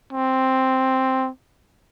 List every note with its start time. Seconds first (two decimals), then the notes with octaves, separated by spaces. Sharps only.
0.13 C4